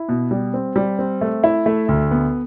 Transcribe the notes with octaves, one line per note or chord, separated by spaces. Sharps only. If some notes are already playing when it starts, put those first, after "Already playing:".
Already playing: E4
B2
G3
C4
G3
C4
A3
E4
A3
D2
B3